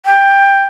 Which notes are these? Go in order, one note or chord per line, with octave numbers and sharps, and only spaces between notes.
G5